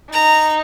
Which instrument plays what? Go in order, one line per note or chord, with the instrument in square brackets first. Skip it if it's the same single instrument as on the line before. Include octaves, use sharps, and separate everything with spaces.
[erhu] D#4 [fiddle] A#5